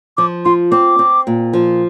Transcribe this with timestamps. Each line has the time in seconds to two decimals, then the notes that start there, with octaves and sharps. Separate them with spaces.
0.17 F3 D6
0.45 F4 C6
0.72 C4 D6
0.99 C4
1.27 A#2
1.53 F3